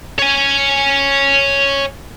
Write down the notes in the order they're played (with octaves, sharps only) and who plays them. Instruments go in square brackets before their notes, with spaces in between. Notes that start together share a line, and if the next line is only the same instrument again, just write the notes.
[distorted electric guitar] C#5 G#5